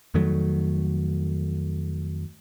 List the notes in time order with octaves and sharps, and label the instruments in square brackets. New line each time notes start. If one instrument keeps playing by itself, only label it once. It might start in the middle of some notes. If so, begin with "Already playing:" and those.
[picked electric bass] F2 D#3 F#3 A3